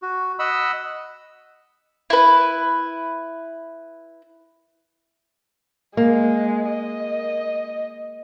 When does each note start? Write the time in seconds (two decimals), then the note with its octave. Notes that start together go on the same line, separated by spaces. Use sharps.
0.02 F#4
0.39 D#5 F#5 B5 E6
2.10 E4 B4
5.97 G#3 A#3
6.69 D#5